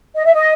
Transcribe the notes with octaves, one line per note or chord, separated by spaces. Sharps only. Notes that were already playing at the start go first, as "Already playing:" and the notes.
D#5
E5
D#5